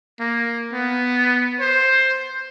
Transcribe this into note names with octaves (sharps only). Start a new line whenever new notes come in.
A#3
B3
C5